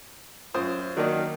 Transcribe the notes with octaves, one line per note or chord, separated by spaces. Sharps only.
F#2 F4 C5 D#6
D#3 F#3 A#3 D4